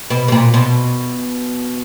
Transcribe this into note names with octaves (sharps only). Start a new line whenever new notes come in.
B2
B2
A#2
B2